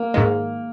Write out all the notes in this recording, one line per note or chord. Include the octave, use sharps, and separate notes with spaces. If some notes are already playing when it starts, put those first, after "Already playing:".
Already playing: A#3
G#2 D#3 G#3